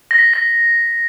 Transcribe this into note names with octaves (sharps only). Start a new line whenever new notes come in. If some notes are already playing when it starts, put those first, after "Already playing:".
A#6
B6
A#6